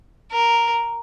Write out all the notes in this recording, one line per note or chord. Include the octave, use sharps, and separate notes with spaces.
A#4